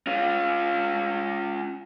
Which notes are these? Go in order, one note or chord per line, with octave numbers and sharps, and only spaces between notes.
C#4 F4